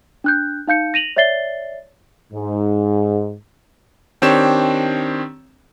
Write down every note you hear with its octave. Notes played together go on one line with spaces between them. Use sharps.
D4 F#6 G6
D#4 F5 G6 C#7
A#6 D#7 F7 F#7
C#5 D5 E5 A6 C7 G7
G#2
D#3 C4 D4 G4 C#5 E7